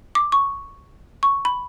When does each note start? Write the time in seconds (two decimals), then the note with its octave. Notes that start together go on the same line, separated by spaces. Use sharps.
0.15 D6
0.32 C#6
1.23 C#6
1.45 B5